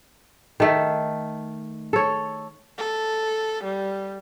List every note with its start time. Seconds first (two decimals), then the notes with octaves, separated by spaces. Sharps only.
0.60 D#3 A3
1.93 A4 C#5
2.78 A4
3.64 G3